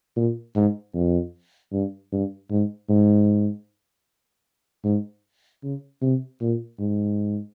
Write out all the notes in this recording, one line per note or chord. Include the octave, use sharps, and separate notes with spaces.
A#2
G#2
F2
G2
G2
G#2
G#2
G#2
C#3
C3
A#2
G#2